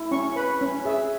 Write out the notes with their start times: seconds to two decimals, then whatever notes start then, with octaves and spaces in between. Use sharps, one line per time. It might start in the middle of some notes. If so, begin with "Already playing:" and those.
Already playing: E4
0.11 C#4 C#6
0.36 B4 B5
0.61 C#4
0.85 G#4 E5